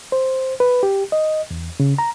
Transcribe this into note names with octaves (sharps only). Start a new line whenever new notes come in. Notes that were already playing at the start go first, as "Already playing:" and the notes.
C5
B4
G4
D#5
E2
C#3
A#5